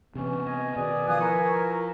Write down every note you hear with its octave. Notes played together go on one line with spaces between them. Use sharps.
C3 E3 B3 C#4
D#5 G#5
B2 D#3 G#4 B4 D5
F3 F5 G#5 D#6 F#6
E4 A#4 B4 C#6